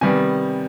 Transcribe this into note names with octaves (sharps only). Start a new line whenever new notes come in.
C3 D#3 G3 B3 G#5